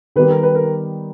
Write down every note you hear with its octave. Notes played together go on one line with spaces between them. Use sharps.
D#3 G3 B3 G4 B4
A#4
B4
A#4